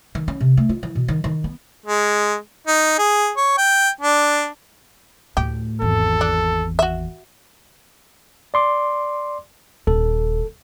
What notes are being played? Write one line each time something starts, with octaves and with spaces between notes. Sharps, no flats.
D#3
C#4
C3
A3
F4
E3
B2
D#3
D#3
B3
G#3
D#4
G#4
C#5
G5
D4
D2 A2 G4
G#1 E2 A4
D4
F#4 E5
D5 C6 D6
D#1 A4